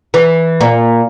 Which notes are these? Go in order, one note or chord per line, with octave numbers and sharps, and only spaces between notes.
E3
A#2